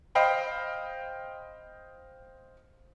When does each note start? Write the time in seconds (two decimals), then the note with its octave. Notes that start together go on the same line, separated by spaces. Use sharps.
0.15 C5 D#5 F5 G5 B5